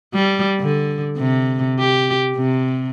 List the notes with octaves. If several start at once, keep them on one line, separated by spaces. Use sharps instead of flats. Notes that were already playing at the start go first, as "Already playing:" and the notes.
G3
D3
C3
G4
C3